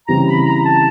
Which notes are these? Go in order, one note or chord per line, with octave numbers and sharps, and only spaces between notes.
C#3 E3 G3 C4 A#5
B5
A#5
A5